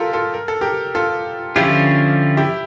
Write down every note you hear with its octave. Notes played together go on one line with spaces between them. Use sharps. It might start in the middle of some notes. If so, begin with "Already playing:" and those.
Already playing: F4 G4 A4 A#4
F4 A4
A#4
A4
G4 A#4
F4 A4
D3 F3 C#4 E4 F4 G4
E4 G4